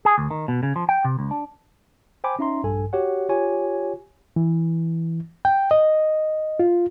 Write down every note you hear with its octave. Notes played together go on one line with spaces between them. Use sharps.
G#4
D2
D#3
B2
C#3
F3
G5
C3
C#2
D4
C5 G5 G#5 B5 D6
C#4 D#4 E5 A#5 C6
A#1 G2 A4 G#5
F#4 G4 C#5 F#5
F4 G4 C#5 G#5
E3
G5
D#5
F4